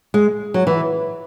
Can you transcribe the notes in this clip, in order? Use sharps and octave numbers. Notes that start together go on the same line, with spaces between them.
G#3
F#3
E3